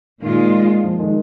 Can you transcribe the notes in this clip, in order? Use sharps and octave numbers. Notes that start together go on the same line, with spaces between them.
A#2 D#3 G#3 F4
F3
D#3 G#3